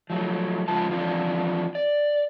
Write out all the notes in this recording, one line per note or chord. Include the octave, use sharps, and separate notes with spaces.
F3 F#3 A3
F2 C#3 G#3 F4 B4 A5
E3 F3 C4 D4 F4
D5